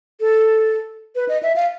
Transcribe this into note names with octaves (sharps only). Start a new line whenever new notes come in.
A4
B4
D#5
E5
F5